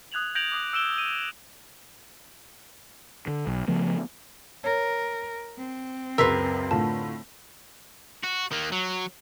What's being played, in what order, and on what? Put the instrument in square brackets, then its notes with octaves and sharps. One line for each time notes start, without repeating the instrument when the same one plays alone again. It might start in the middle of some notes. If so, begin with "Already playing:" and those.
[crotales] D#6 F#6 G#6 F7 F#7
G6 G#6 A#6 D7 F7 F#7
D6 D#6
E6 D7 E7 G7
D#7
[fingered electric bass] D3
B1
C#3 F3 A3 B3
[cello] A#4 [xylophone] C#5
[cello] C4
[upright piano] C#2 F#2 C6 [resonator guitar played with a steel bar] A#4 B4 [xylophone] E6 B6 C7
[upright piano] A2 D3 F4 [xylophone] A5
[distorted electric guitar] F#4
D#3 A#3
F#3